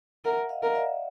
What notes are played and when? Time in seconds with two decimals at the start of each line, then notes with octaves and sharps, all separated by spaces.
0.25 A#4 E5 F#5
0.49 D#5 F5
0.63 A#4
0.75 D5 E5